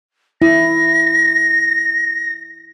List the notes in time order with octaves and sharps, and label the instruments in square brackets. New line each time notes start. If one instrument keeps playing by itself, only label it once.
[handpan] E4 [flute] A#6